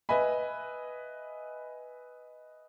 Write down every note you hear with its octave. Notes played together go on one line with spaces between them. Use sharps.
B4 D#5 E5 G#5 B5